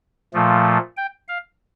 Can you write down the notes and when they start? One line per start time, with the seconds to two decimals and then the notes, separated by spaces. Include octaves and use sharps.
0.34 A#2 F3 A3
0.97 G5
1.28 F5